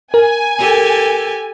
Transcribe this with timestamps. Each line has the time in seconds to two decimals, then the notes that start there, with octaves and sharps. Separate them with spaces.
0.14 A#4 G#5
0.59 G4 A4